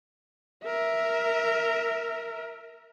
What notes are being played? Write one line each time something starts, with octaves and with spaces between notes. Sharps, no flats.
A#4 E5